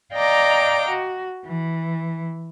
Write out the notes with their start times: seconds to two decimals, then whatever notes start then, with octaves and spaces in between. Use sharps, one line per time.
0.14 D5 D#5 F5 G5 A#5 D6
0.89 F#4
1.47 E3